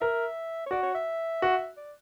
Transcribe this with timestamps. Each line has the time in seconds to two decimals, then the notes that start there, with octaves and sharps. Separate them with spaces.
0.01 A#4 E5
0.66 C#5
0.71 F#4 D5
0.83 C#5
0.95 E5
1.42 F#4
1.77 D5